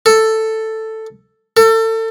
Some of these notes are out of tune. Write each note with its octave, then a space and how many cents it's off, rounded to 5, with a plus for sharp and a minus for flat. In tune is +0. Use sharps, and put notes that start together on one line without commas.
A4 +5
A4 +30